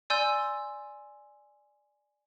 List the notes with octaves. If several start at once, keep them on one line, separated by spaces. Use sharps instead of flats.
D5 G#5 C6 E6 G6